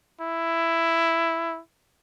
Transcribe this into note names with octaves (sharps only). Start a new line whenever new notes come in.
E4